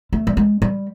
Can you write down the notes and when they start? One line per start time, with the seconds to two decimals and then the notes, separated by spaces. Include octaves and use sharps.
0.13 A3
0.27 G3
0.37 G#3
0.62 G3